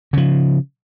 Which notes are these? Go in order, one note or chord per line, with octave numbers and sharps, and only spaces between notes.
C#3 F3